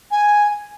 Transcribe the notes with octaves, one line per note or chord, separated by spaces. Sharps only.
G#5